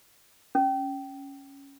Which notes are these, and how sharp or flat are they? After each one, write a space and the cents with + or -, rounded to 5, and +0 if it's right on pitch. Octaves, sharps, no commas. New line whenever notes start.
C#4 +0